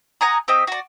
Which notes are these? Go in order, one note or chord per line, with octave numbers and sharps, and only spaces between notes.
F#5 G#5 A#5 D#6
C4 G4 D#5
F#4 D5